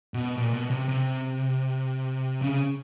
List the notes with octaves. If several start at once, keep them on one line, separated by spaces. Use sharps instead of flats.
B2
A#2
B2
C3
C3
C#3